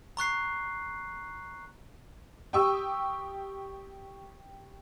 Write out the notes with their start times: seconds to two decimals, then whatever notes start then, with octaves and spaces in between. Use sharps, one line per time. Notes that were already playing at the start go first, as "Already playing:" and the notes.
0.17 A#5 C#6 F#6 C7
2.53 G4 G5 C#6 D#6 E6